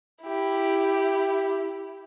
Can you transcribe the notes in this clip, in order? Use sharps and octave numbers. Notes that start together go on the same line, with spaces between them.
E4 G4